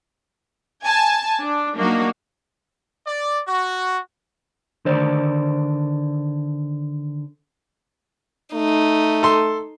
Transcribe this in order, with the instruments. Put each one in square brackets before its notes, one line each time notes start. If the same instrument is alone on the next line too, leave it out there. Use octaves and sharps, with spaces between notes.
[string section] G#5 A5
D4
F#3 A#3 D4 D#4 F#4
[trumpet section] D5
F#4
[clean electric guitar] D3 D#3 C5 D5
[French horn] A3 [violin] D#4
[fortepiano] A4 C6